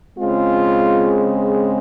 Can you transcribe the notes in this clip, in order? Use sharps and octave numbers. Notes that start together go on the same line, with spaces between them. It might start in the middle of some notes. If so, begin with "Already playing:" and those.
C#3 G#3 C4 F4